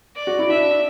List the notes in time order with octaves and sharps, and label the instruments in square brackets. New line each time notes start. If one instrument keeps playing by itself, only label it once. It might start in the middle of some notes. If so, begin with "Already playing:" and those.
[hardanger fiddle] D5
[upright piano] F#4
E4
[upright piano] D4 [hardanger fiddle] E5